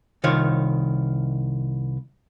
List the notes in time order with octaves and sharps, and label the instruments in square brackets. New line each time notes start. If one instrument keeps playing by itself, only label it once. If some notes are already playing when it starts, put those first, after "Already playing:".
[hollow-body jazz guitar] C2 D#3 F4 C#5